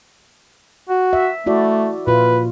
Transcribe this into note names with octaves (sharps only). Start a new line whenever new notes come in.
F#4
E5
A3 E4 F#4 D5
A#2 F4 B4